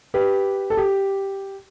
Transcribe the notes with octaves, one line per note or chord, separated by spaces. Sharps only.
G4 B4
A4
G4